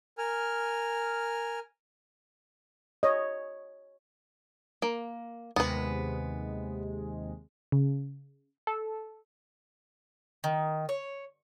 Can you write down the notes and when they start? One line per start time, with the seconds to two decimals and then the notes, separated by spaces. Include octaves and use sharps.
0.18 A#4 G#5 F6
3.03 C#5 D#5
4.82 A#3
5.56 D#2 C3 G#3 B3 B4
7.72 C#3
8.67 A4
10.44 D#3
10.89 C#5